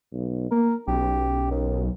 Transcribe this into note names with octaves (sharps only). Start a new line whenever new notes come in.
B1
A#3 A#4
B1 C#4 G4
D#2